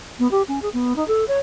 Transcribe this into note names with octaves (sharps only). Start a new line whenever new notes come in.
B3
G4
C#4
G#4
B3
D#4
A4
C#5